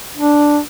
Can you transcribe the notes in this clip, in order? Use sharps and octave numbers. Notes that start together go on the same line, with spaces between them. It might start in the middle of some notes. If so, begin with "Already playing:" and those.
D4